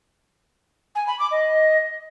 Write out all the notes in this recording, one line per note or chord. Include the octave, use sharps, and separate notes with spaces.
G#5
B5
D6
D#5